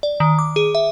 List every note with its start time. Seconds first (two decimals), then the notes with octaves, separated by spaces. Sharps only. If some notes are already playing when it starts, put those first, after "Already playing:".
0.03 D5
0.20 D#3
0.39 D6
0.56 G#4
0.75 E5